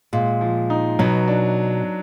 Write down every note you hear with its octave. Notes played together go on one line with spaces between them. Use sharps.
A#2 G#3
F3
D#4
B2 F#3
D4